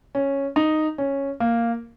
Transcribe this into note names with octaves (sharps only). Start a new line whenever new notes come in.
C#4
D#4
C#4
A#3